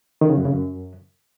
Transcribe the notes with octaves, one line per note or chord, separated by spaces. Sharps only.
D#3
C#3
F#2
C#3
F#2